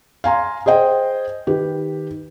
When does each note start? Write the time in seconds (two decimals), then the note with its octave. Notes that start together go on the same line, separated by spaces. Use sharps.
0.24 F5 G#5 A#5 C6
0.66 G#4 C5 D#5 G5
1.47 D#3 G4 B4